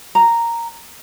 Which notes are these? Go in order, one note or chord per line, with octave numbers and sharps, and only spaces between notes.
A#5